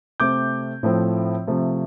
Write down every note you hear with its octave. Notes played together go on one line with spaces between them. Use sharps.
C3 A3 C4 D6 G6
A2 F3 A3 C4
C3 F3 A3